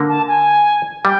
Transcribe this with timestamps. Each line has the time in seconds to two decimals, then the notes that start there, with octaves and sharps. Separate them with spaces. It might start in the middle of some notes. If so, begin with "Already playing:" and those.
Already playing: D3 A#3
0.09 A5
0.28 G#5
1.04 G3 G5